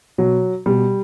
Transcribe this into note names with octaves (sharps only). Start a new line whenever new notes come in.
B2 F#3
B2 G3